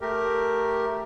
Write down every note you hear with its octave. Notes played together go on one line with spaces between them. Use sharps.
A3 G4 A#4